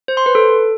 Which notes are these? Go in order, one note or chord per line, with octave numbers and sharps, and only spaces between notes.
C5
C6
B4
A4